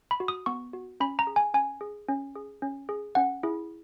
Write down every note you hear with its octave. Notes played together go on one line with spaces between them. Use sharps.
B5
F#4
D#6
B3 C#6
F#4
C#4 B5
A#5
G#4
G#5
C#4 G#5
G#4
C#4
G#4
C#4
G#4
C#4 F#5
E4 G#4